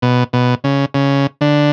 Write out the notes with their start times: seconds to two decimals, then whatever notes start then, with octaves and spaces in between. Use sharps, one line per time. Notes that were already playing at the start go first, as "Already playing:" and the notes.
0.02 B2
0.33 B2
0.64 C#3
0.94 C#3
1.41 D3